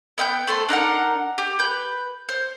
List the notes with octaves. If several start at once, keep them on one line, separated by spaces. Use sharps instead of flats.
B3 E5 G5 G6
A3 A4 C5 C6
D4 D#4 A#4 F#5
G4
B4 G6
C5